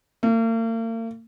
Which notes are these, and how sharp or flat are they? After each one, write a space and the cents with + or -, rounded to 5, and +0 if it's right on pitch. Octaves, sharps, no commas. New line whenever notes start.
A#3 -45